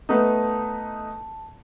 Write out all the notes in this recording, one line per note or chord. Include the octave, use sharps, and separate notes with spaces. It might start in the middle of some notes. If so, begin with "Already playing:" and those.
A3 B3 D#4 A5